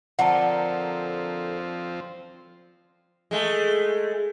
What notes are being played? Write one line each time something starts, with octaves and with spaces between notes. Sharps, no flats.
D3 F3 C4 A4 A#4 F#5 A5
G#3 A3